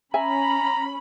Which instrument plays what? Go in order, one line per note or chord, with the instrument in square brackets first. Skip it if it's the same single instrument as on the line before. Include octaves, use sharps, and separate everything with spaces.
[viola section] C#4 B5 [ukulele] E5 G#5 [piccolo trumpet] A#5